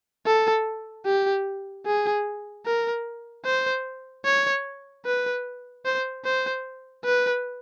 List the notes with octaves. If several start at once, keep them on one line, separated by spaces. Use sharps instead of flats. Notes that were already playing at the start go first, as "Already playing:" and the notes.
A4
G4
G#4
A#4
C5
C#5
B4
C5
C5
B4